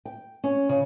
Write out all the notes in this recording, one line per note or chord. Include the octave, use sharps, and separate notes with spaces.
G5
C#4
C#3